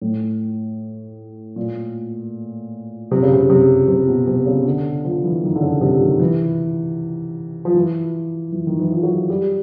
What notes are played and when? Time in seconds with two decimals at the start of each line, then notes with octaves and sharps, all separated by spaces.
0.01 A2
1.56 A#2
3.11 C3
3.22 C#3
3.33 C3
3.50 C3
3.88 C3
4.07 B2
4.27 C3
4.46 C#3
4.66 D3
5.05 F3
5.24 E3
5.43 D#3
5.55 D3
5.62 C#3
5.81 C3
6.01 D#3
6.20 E3
7.65 F3
7.74 E3
8.52 E3
8.67 D#3
8.80 E3
8.92 F3
9.03 F#3
9.30 G3